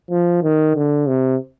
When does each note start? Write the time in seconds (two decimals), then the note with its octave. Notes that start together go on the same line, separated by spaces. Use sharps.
0.11 F3
0.43 D#3
0.76 D3
1.07 C3